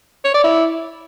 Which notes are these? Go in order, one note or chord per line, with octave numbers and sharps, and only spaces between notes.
C#5
D5
E4